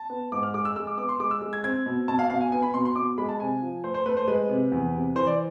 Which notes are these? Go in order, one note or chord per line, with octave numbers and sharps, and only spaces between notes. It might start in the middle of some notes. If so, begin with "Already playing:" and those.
Already playing: A5
B3
G#2 D6
F6
G#3 D6
E6
G#3 E6
D6
B3 D6
C6
G#3 D6
E6
G#3
G#6
C4 G#6
B2
B2 A5
F5
B2 F5
G#5
B3 G#5
B5
B2 C6
C6
B2 D6
G#3 B5
A5
C3 G#5
F3
A3 C5
C5
A3 B4
C5
G#3 B4
C3
E2
C3
E3 C5
D5